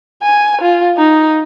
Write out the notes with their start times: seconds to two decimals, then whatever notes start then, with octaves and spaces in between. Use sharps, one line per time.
0.23 G#5
0.61 F4
0.97 D#4